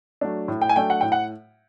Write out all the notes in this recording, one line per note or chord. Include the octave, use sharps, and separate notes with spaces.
F#3 A3 D4
A2
G5
G#5
F#3 A3 D4 G5
F#5
A2 G5
F#5